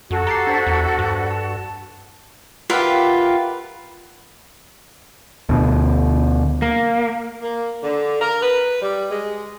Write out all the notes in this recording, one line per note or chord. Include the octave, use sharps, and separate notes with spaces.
F#2 F#4 A4
G4 A#5 A6 C7
D4 C5 B6
E2
G2
A5
F4 G4 A#4 B4 E5 F#5
D2 B2 D3
A#3
A#3
D3
A#4
B4
G3
G#3